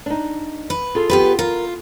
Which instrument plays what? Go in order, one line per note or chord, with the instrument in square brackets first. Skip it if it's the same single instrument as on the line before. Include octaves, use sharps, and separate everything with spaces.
[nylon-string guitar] D4 D#4
[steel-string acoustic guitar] B4
[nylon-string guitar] F4 G#4 A4
[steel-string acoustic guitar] B3 G4 B4
[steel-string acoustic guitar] F4 [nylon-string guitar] A#4